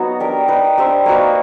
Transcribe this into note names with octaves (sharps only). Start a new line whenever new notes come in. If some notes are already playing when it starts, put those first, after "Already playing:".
Already playing: F#3 B3 D#4 F#4
D4 G4 A#4
D#4 G4 B4
D4 G4 C5 E5
A#3 D#4 F#4 B4